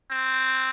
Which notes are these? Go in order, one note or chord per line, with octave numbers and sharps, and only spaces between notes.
C4